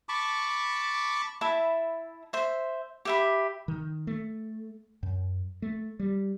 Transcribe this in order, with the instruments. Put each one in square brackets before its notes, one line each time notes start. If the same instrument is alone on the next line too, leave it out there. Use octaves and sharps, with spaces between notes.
[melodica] A5 B5 C#6 D6
[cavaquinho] E4 E5 A5 B5
C5 E5
G4 E5 B5
[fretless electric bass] D#3
A3
F#2
A3
G3